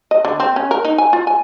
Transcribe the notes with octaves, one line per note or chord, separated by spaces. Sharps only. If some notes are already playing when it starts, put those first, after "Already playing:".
D#5
D3
C4
C#4
A#4
D#4
G#5
F4
G#5